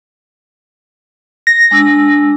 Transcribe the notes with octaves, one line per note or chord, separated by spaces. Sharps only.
A#6
G#3 D4 E6